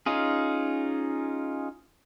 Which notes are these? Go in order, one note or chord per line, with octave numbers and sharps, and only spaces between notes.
C#4 D#4 F4 G#4